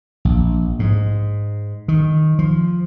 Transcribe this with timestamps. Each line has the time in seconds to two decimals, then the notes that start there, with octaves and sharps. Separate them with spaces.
0.25 A#1
0.79 G#2
1.88 D#3
2.39 F3